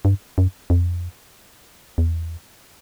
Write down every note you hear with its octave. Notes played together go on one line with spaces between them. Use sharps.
G2
F#2
F2
E2